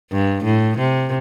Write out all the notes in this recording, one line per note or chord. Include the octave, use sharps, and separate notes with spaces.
G2
A2
C3